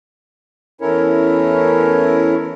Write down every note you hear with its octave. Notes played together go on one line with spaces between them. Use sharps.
E2 A3 C#4 E4 A#4 C#5